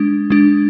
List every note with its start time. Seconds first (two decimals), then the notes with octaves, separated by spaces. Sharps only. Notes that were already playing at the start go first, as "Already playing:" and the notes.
Already playing: G#3 D4
0.30 G#3 D4